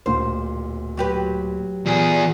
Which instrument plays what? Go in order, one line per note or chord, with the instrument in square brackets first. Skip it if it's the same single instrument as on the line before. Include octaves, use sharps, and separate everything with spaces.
[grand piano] D1 A#2 [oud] C5
[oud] F#3 G4 B4
[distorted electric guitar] E2 G#4 [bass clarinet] A#2